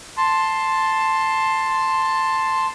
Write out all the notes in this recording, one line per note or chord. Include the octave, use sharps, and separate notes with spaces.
A5 C6